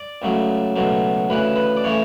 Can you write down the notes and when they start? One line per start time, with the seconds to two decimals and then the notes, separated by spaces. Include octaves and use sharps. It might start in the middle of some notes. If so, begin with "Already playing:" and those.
Already playing: D5
0.22 C#2 C#3 F#3 A3
0.76 C#2 B2 F#3 A3
1.29 D2 C#3 E3 B4
1.56 B4
1.77 D5
1.84 C#3 E3 A3 C#5